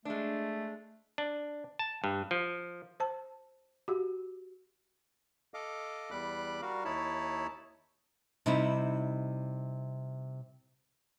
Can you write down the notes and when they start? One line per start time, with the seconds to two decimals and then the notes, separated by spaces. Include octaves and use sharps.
0.05 G#3 A3 D4
1.18 D4
1.79 A5
2.04 G2
2.31 F3
3.00 C5 A5
3.88 F#4 G4
5.54 A4 D#5 F5 D6
6.11 E2 G3 B5 D6 F#6
6.62 G3 F#4 A#4 F5
6.85 D#2 D#4 E4 C#5 A5 B5
8.46 C3 G3 D#4 E4